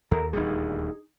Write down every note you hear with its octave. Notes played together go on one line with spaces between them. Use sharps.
D#2 A4 A#4
D#1 D2 G3 D#4 G#4